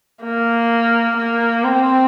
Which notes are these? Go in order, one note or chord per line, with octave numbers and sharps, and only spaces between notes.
A#3
A#3
C4